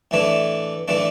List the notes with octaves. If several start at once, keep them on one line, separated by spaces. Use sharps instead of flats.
A2 E3 A3 D4
A2 E3 A3 D4